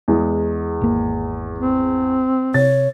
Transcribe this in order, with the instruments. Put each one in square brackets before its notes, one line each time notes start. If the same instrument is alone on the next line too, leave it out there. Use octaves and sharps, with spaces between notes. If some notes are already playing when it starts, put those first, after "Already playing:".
[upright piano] E2 G#3
[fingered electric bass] G#1 A#3
[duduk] C4
[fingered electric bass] C3 [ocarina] C#5 [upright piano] A6